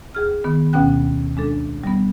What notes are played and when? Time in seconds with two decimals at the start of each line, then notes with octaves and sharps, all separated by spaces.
0.15 D#2 G#4 F6
0.44 D#3 B3
0.73 D2 B2 B3 C#4 G5 F#6
1.37 G#3 D4 A4
1.84 G3 B3